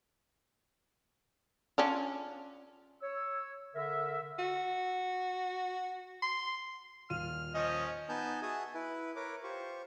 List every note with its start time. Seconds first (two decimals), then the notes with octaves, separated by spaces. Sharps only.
1.78 C#4 D4 F4
3.02 C#5 E6
3.75 D3 A#4 E5
4.39 F#4
6.22 C6
7.10 D#1 F4 F6 D#7
7.55 F3 C#4 D#5
8.09 B3 D#4 B4 G#5 A5 G6
8.42 F#4 G#4 E5 G#5 A5 D#6
8.74 E4 B4
9.16 A#4 B4 C#5 D6
9.43 F4 G4 C5 C#6